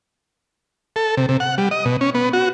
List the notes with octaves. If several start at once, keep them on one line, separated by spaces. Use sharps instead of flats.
A4
C3
C3
F#5
G3
D#5
B2
C#4
B3
F#4